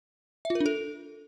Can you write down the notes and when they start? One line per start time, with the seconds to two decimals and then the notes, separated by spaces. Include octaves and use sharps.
0.45 E5
0.50 F4
0.55 A#4
0.60 D4
0.66 A4